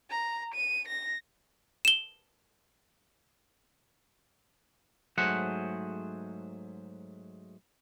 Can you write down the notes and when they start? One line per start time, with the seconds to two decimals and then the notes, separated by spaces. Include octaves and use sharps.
0.11 A#5
0.54 D#7
0.88 A#6
1.85 E7 G7
5.18 G#2 F#3 A3 G#4 C5 F#5